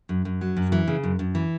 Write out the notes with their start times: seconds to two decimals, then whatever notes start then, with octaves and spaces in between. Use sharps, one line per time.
0.09 F#2
0.25 F#2
0.41 F#3
0.57 F#2
0.72 E3
0.87 C#3
1.03 F#2
1.19 F#2
1.35 E3